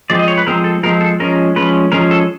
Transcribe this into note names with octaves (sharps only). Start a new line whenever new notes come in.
F3 G#3 C4 D5
D#5
C#5
B4
F3 G#3 C4 A#4
A4
F3 G#3 C4 A#4
A4
F3 G#3 C#4 A#4
F3 G#3 C#4 B4
F3 G#3 C#4 A#4
A4